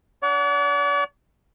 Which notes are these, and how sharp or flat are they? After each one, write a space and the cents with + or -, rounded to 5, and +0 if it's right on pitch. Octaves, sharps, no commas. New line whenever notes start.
D4 +0 D5 -45 F#5 +0